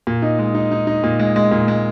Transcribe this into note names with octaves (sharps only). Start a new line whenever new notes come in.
A#2
D#4
G#3
D#4
D#4
D#4
A#2
G#3
G#3
A#2
G#3